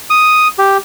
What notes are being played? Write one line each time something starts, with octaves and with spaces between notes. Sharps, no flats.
D#6
G4